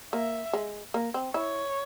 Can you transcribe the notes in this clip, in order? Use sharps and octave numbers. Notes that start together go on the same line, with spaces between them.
A#3 E5
G#3
A#3
C4
E4 C#5